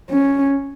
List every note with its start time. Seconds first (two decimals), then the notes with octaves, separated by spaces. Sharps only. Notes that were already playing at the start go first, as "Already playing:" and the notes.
0.11 C#4